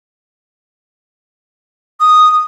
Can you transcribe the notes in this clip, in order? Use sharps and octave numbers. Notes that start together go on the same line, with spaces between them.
D#6